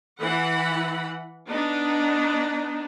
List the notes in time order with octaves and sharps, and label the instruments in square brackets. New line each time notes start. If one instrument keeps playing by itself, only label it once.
[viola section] E3 F#5 B5
B3 D4 D#4